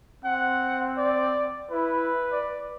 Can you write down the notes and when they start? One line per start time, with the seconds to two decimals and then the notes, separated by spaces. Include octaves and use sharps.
0.25 C4 F#5
0.98 D5
1.71 E4 B4
2.32 D5